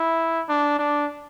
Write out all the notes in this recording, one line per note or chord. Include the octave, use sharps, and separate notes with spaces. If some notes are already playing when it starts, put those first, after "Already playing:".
Already playing: E4
D4
D4